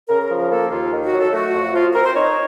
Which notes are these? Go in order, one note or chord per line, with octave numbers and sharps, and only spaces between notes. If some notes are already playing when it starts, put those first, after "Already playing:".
C#3 A#4
A#4
F3
A#4
A#3 A4
D#2 F4
D#3
F#4
F#3
A4
A3 F#4
F2
F3 F4
C4 A#4
C5
D#4 C#5